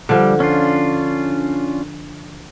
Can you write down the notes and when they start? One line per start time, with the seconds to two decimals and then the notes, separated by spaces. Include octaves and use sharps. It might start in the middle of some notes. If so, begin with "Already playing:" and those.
0.09 D3 F3 G3
0.40 C#4 D4 F4